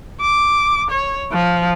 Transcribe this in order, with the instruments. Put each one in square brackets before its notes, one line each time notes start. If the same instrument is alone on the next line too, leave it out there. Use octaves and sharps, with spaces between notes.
[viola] D6
C#5
F3